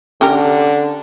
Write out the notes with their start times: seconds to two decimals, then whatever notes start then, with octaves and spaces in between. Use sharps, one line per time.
0.21 D3 C#4 G4 A#4